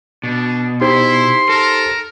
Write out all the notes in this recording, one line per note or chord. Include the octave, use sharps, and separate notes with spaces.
B2 D4
D#4 E4 G4 C5 C6
A4 A#4